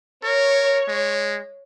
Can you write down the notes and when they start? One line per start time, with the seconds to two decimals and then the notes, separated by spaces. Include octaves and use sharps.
0.24 A#4 C#5
0.88 G#3